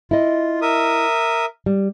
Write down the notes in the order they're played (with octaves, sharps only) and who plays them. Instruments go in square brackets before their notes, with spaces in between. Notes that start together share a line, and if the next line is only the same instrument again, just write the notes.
[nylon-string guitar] E4 D#5 [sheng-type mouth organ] F4
[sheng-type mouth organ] A#4 E5 D#6
[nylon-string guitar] G3